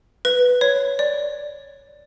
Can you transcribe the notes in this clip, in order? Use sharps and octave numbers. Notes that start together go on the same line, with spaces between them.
B4
C#5
D5